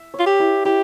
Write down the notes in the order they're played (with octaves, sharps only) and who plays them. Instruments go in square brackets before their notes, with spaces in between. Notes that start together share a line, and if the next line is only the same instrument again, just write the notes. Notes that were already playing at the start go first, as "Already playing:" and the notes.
Already playing: [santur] E5
C#5
[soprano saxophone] F4
G4
[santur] E4
[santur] E4 [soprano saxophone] G4